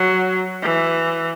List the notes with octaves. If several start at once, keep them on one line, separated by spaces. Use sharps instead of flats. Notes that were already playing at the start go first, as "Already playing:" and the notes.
Already playing: F#3
E3